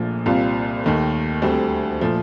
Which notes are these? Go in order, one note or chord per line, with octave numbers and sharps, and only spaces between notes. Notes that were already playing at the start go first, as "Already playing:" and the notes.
Already playing: A#1 A#2 F3 A3
C2 A#2 G3 C4 F4
D#2 D#3 A3
D2 D3 G3 C4
A#2 F3 A3